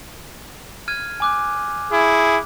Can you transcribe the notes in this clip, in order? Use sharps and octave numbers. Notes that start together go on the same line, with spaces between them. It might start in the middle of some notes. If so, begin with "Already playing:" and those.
F6 G#6 D#7
G#5 D6 F#6
E4 G#4